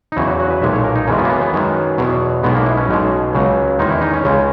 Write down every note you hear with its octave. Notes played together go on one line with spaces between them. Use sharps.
D#4
E2 C#3 F#3 E4
F#4
F#4
B4
B1 A#2 G#3 E5
C#5
A#4
D#4
F#2 C#3 E3 G#3 C#4
B3
A#3
B3
B3
F#2 D#3 G#3
E2 B2 F#3
B1 B2 G#3 B3
A#3
E4
C#4
B1 B2 G#3
C#2 C#3 F#3
E2 D#3 G#3 D#4
E4
D#4
C#4
C#2 C#3 G#3